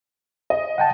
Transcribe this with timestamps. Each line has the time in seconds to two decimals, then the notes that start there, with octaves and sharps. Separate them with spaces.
0.50 D#5
0.78 F#5 G5 A5